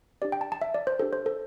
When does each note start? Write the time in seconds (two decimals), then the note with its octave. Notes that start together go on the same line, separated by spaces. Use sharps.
0.22 D4 G4 D5
0.32 G5
0.41 A5
0.52 A5
0.62 E5
0.74 D5
0.87 C5
0.99 D4 G4 A4
1.13 C5
1.26 A4